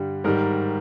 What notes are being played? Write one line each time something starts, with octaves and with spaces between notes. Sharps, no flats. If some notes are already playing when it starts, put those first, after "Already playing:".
Already playing: G2 D3 G3 G4
G#2 D#3 G3 A#4